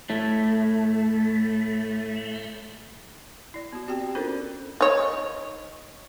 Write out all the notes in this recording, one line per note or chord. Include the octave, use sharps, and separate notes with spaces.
A2 A3
E4 D5
B3 F#4
C4 F#4 G4 G5
D5
C#4 D4 F4 A4 A#4 C5
D#4 C#5